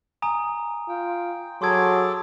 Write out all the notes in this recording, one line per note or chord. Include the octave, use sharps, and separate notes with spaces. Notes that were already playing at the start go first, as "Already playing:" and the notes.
G#5 A#5 D#6
F4 G5
F#3 G#4 A4 C6 D6 G#6